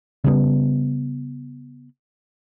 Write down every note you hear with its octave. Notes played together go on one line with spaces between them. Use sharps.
C#3 G3 B3